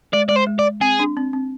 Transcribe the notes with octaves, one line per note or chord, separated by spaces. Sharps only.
G#3 D5
G#3 D5
C5
G#3
D5
C4 G#4
D4
C4
C4